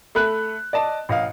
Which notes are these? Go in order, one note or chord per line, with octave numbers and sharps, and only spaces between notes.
A3 A4 B5 F#6
D5 D#5 A5
A1 D#5 F5